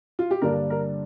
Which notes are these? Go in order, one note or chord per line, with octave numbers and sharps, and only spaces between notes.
F4
G4
G2 D3 G3 A#3 D4 A#4
A#4